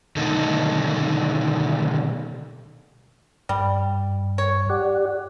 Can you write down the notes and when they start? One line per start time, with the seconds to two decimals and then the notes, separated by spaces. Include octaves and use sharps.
0.16 B2 D3 D#3 A3 D#4 A4
3.49 G2 G3
4.38 C#5
4.70 G4 D5 F#5